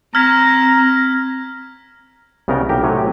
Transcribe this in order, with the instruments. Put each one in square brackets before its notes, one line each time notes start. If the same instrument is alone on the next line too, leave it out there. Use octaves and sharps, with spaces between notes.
[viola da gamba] C4 [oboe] A#5 [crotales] F6 G#6 B6
[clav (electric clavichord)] C2 C#3 B3 A#4 G5 A#5
B1 G4 A#4 G5
A2 C3 F#3 C#5 G#5